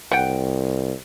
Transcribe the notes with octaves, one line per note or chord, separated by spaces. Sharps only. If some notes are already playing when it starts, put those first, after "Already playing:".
C2 F#5 G5